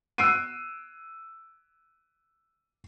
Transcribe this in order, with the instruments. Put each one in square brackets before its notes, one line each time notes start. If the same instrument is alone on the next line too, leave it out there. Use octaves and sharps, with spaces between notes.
[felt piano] E6 F#6 C7 D7 D#7